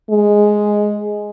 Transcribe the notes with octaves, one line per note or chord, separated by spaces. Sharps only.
G#3